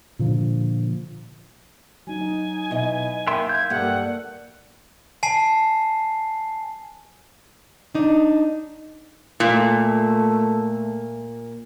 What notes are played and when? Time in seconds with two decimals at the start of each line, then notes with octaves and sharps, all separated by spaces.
0.19 A#2 D3 F3
2.07 F#3 D#4 G#5
2.21 D#4
2.71 B2 E4 D#5
3.27 A#3 E5 G5 C6
3.49 E5 G6 G#6
3.70 G2 G3 A#3 G4 A4 F#5
5.23 G#5 A5 C7
7.95 D4 D#4 D5
9.40 A#2 A3